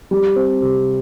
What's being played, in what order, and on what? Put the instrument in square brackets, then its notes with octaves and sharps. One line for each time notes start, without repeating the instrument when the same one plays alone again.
[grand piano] G3
C4
C3